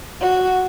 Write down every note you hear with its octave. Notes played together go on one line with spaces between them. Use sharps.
F#4